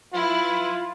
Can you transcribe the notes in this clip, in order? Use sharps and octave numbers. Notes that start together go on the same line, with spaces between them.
F#3 E4 F4 B4